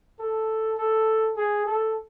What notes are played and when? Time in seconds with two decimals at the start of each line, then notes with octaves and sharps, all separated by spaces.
0.19 A4
0.78 A4
1.37 G#4
1.66 A4